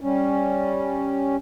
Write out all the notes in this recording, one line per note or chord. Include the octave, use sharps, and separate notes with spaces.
G3 C#4